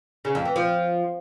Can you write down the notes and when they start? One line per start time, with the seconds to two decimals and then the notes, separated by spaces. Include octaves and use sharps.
0.25 C#3
0.35 F2
0.45 E3
0.56 F3